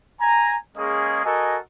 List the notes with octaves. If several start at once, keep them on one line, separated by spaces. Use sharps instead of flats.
G#5 A#5
G#3 A#3 C#4 G#4 D#5
F#4 A4 A#4 D#5 G#5